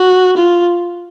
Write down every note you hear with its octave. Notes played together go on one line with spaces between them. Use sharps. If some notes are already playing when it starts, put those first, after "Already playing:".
Already playing: F#4
F4